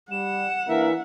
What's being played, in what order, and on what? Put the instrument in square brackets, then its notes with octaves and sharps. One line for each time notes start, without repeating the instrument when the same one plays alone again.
[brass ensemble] G3 [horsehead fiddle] F#5 [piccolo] E7
[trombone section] E3 [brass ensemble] A#3 D4 A#4 [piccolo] E5